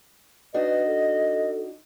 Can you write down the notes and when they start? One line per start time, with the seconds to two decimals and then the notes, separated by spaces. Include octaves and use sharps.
0.54 D4 D#4 F#4 B4 D#5
0.87 A4